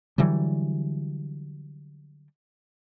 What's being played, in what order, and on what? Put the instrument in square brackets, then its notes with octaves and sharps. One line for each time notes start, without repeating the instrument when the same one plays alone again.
[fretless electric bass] D3 E3 F#3 G3